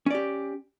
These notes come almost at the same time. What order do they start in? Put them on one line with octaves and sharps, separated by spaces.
C#4 D5 G4